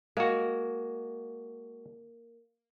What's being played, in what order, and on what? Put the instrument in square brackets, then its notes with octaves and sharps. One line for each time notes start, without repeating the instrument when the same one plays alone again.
[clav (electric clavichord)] G#3 F#4 [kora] A#3